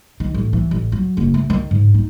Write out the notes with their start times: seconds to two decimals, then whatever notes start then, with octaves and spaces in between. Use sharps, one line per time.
0.20 D#3
0.34 A1
0.53 E3
0.71 A1
0.92 F#3
1.17 F#1
1.34 A3
1.50 D#3
1.71 G#2
1.94 D#4